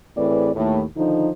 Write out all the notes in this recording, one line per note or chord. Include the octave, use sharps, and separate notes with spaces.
A2 E3 C4 G#4 B4 D5
D#2 A2
D3 D#3 F3 D#4